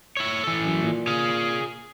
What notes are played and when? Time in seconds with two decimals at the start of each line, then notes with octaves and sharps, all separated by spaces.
0.17 E4 C#5
0.43 E3 A4
0.65 F#2
0.82 A#2
1.08 G#4 F5